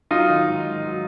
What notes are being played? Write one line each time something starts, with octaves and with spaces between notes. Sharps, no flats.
F#3 D#4 F4
D#3
G#2
G#2
F#3